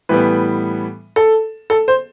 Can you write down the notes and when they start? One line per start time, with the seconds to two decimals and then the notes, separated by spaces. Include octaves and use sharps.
0.09 A2 E3 G3 B3 B4
1.16 A4
1.70 A4
1.88 C5